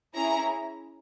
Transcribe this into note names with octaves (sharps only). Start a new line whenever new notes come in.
C#4 E4 G#4 A#5